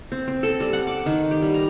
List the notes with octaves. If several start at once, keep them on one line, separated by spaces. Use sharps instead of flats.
C4
C4
A4
G3
F#5
D6
D#3
G4
G3
A#5